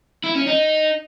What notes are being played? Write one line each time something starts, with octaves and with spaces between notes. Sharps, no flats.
E4
C#4
D#4